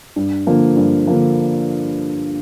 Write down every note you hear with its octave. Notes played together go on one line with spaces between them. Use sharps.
G2
D3 F3 A#3
G2
D3 F3 A#3